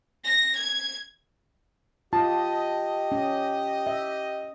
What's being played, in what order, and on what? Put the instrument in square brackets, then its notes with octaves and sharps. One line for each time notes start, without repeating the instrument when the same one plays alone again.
[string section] A#6
G#6
[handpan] F4 [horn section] G4 D#5 [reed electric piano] A5
[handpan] C#4
E5